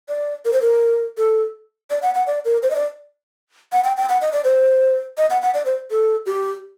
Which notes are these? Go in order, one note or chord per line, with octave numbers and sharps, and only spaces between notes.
D5
A#4
C5
A#4
A4
D5
F#5
F#5
D5
A#4
C5
D#5
D5
F#5
G5
G5
F#5
D#5
D5
C5
D#5
F#5
F#5
D5
C5
A4
G4